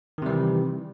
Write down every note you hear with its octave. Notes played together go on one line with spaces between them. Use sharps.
C3 D#3 E3 G3